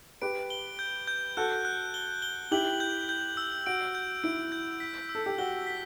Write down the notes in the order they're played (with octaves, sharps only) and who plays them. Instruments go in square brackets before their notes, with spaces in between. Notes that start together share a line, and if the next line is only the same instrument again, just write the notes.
[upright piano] G4 B4 [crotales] D7
[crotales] G7
G6
G6
[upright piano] F#4 A4 [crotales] F#6
[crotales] F#6
G7
G7
[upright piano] E4 G4 [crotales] F#7
[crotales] G6
G6
E6
[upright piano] F#4 [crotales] D7
[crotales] G6
[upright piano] E4 [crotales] D7
[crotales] G6
B6
E6
[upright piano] A4
G4
[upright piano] F#4 [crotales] G7
[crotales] B6